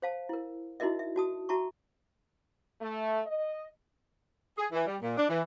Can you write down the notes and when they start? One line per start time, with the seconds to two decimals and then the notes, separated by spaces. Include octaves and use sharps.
0.02 C5 F5 A5
0.29 E4 A#4
0.80 D#4 E4 F#4 A#4 D#5 E5
0.99 E5
1.16 F#4 A5 D#6
1.49 F#4 E5 A5 A#5 C#6
2.81 A3
3.26 D#5
4.58 G#4
4.72 E3
4.86 G3
5.01 A#2
5.18 D4
5.29 E3